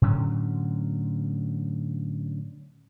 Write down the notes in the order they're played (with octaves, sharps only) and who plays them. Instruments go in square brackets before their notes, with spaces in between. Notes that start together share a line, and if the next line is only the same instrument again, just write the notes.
[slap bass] A2 D3 F#3 C#4